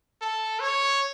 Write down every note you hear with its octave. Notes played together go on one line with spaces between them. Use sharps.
A4
C#5